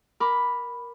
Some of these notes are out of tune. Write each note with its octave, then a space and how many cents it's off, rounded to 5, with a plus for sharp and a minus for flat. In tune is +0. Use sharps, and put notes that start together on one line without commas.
A#4 +10 B5 +0 D6 +0